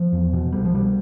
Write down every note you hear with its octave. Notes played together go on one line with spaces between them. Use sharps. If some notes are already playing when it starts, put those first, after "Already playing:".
Already playing: F3
E2
B2
C2 G3
F3
B2 G3